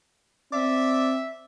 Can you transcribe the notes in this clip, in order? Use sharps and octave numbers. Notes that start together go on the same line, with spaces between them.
C4 D5 E5